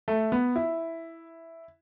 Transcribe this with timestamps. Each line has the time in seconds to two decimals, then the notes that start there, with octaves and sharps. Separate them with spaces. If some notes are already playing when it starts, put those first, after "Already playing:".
0.08 A3
0.32 B3
0.56 E4